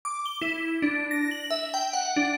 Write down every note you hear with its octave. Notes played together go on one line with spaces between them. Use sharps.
D6
G7
E4
D4
A#6
F#7
E5
G5
F#5
D4